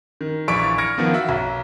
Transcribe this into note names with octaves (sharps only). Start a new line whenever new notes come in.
D#3
A#1 E3 D5 C#6 B6 D7
F6 G#6 A#6 C#7 D7
D#3 F3 B3
F#4 E5 F#5
B1